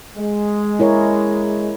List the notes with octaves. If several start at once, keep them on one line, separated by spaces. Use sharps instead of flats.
G#3
E4 A#4 C#5